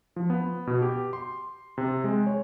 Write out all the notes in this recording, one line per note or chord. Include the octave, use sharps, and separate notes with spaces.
F3
B3
B2
G4
C6
C3
G#3
C#5